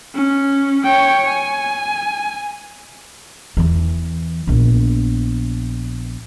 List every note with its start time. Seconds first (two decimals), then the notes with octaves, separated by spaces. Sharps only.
0.15 C#4
0.84 C#5 G5
1.28 G#5
3.57 E2 E3
4.47 A#1 B3